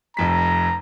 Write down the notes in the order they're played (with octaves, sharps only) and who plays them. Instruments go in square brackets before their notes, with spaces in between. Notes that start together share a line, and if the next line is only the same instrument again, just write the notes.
[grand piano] F1 F2 B6 [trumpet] A#5